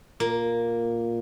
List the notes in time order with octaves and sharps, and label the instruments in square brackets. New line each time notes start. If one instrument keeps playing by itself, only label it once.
[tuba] A#2 [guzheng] A#3